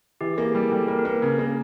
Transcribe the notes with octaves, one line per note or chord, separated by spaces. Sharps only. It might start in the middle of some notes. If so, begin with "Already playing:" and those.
E3 G4
A#3 G#4
G4
G3 G#4
G3 A4
A#3 A#4
A#4
A#3 B4
C#3 A#4
A#3